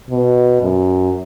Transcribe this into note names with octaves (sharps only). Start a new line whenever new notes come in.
B2
F#2